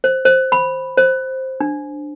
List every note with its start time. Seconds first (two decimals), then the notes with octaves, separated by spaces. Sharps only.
0.04 C5
0.25 C5
0.52 B5
0.97 C5
1.61 D4